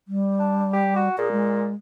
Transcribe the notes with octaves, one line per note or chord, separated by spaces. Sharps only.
G3
D4
G4
F#4
A#2 G#4
G#3